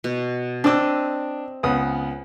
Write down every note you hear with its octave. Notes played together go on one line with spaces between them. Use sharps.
B2
C4 D4 D#5 D6 E6
C#2 B3 D#6